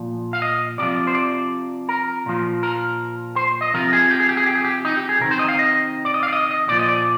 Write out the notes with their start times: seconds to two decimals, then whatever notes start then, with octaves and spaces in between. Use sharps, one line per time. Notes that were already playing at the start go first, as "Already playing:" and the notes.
Already playing: A#2 F3
0.33 F5
0.42 D#5
0.78 C3 F3 D5
1.07 C5
1.15 D5
1.89 A#4
2.26 A#2 F3
2.63 A#4
3.36 C5
3.61 D#5
3.74 C3 F3 A#4
3.93 G#4
4.11 G4
4.20 G#4
4.29 G4
4.37 G#4
4.46 G4
4.55 G#4
4.64 G4
4.85 D#4
4.97 G4
5.09 G#4
5.21 C3 D#3 A#4
5.31 C5
5.39 D#5
5.48 F5
5.59 D#5
6.05 D5
6.14 D#5
6.23 F5
6.28 D5
6.33 D#5
6.51 D#5
6.68 A#2 F3 D5
6.79 D#5
6.89 D5